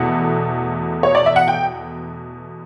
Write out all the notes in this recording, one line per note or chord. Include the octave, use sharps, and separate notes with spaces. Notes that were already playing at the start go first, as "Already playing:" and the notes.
Already playing: E2 B2 A3 F#5
C#5
D5
E5
F#5
G5